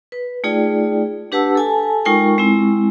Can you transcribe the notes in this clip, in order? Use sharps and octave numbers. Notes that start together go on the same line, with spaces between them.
B4
A3 D#4 F4 G#4 D5 G5
D4 G4 B4 F#5 A5 E6
A4 G#5 A5
G#3 D#4 F4 A#4 G5 C#6
G#3 C4 E4